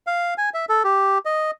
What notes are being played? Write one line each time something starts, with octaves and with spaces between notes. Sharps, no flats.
F5
G#5
E5
A4
G4
D#5